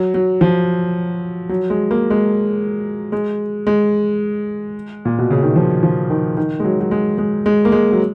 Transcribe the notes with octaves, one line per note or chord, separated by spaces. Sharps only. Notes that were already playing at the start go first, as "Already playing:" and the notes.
Already playing: F#3
F#3
F3
F#3
G#3
A#3
G#3
G#3
G#3
A#2
B2
C#3
D#3
F3
F3
D#3
D#3
G#3
F#3
F#3
G#3
G#3
G#3
A#3
G#3
F#3